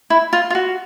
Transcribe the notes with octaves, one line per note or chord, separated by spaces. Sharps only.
E4
F4
F4
F#4